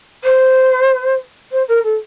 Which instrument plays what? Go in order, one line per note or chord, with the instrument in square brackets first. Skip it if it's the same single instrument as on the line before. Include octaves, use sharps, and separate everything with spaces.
[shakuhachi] C5
C5
A#4
A4